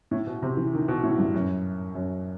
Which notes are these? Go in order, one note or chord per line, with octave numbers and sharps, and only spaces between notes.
A2
B2
C3
E3
D#3
B2
A2
G2
F#2
F#2